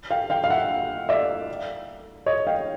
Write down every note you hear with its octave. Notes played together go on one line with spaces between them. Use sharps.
F5 G5
F5 G5
F5
E5 F#5
D5 E5
C#5 D#5
F5 G5